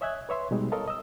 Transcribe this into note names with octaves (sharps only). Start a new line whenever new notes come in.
C#5 D#5 E5 G#5 F#6 G#6
B4 C#5 E5 C6
B2 G3 G#3 D#4
A4 A#4 C#5 D#5 F5 A5
D#5 E6